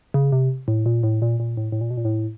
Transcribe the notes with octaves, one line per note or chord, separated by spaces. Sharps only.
C#3
C3
A2
A#2
A2
A#2
A#2
A2
A2
A#2
B2
A#2
A2